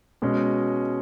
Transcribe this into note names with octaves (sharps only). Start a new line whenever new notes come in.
B2 G#3 C#4